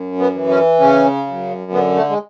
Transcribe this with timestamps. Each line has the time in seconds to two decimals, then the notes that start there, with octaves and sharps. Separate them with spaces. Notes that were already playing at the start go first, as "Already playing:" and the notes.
Already playing: F#2
0.19 B3
0.34 E3
0.49 C#4
0.80 C#3 C#4
1.27 F#2
1.72 D3 B3
1.96 A3
2.09 G#3